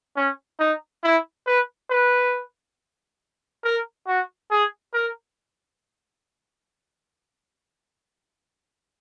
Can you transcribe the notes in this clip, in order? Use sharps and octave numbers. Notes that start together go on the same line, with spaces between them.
C#4
D#4
E4
B4
B4
A#4
F#4
G#4
A#4